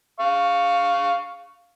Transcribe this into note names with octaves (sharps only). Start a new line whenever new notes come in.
F5 C#6